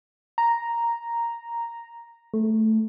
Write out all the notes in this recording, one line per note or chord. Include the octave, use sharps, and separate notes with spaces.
A#5
A3